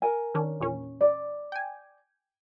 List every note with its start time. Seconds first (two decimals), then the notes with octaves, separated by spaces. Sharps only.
0.02 A#4 G#5
0.35 D#3 C#4 D4
0.60 E2 A#2 C#4
1.01 D5
1.52 G5 G#5